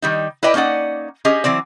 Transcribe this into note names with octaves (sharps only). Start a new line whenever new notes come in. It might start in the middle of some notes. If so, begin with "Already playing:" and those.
D#3 G3 D#4
E4 B4 D5 D#5 G5
A#3 C#4 D#4 D5 F#5
C#4 G4 G#4 D#5
E3 F#3 C4 D5